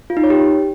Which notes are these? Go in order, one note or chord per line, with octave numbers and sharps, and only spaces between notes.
F4
D#4
C#5
G4